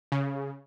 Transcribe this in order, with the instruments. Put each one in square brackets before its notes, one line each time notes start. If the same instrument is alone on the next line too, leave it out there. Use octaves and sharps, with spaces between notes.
[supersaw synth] C#3